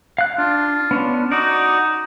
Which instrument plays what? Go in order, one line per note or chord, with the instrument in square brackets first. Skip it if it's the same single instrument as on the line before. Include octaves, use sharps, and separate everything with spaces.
[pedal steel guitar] F5 F#6
[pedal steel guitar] D4 [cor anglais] F4
[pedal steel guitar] B3 C#4 D4
[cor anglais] D#4 [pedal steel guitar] F#4 D5